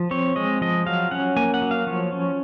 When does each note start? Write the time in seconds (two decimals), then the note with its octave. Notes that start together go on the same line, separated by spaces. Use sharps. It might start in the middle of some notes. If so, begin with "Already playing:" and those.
Already playing: F3
0.11 C4 C#5
0.36 G#3 D#5
0.61 F3 D#5
0.87 F#3 F5
1.11 C#4 F#5
1.36 A#3 G#5
1.54 F#5
1.62 F#3
1.71 F5
1.87 F3 C#5
2.12 C#4